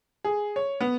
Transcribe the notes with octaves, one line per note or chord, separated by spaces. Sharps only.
G#4
C#5
B3